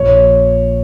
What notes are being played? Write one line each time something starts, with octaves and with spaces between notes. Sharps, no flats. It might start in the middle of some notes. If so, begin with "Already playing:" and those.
Already playing: A#1 C#5